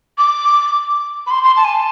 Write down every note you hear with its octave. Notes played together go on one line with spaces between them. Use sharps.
D6
B5
C6
C6
A5
G#5
A5